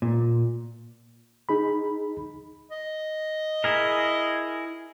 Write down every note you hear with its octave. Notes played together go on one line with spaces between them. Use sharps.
A#2
D#4 G#4 B5
D#5
E4 G#4 A#4